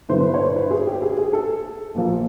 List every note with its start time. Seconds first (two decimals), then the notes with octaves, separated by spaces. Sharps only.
0.09 G2 D3 F#3 B3 E4 C5
0.21 B4
0.34 C#5
0.43 C5
0.56 B4
0.70 G#4
0.87 G4
1.02 G#4
1.17 G#4
1.33 A4
1.95 A#1 A#2 F3 A#3